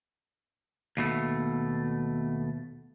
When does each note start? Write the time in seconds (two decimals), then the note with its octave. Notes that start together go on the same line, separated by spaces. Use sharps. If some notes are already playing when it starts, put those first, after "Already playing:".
0.97 D#2 B2 A3